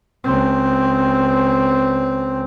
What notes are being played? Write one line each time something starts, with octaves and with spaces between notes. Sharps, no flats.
C#2 C4